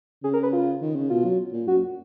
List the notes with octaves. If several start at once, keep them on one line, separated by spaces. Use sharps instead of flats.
C#3 G#4
A#4
B4
F4
D#3
C#3
B2 F4
F#3
A#2
F#2 F#4